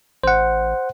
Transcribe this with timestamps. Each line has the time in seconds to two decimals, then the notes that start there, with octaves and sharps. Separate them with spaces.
0.24 A1 C5 F#5